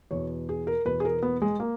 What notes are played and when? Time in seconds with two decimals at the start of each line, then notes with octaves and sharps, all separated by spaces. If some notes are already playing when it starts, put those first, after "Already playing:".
0.11 E2 B2 C#5
0.49 G#4
0.67 A#4
0.85 E2 B2 B4
1.00 G#4
1.05 A#4
1.23 B3
1.42 G#3
1.60 A#3